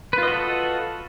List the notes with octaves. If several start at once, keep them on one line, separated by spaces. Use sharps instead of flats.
F4 F#4 A4 B4 D#5